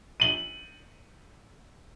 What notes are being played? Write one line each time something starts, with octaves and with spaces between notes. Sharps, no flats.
D#7 F#7